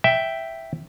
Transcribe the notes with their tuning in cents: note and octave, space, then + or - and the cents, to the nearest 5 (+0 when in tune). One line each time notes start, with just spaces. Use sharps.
E5 +0 G5 -5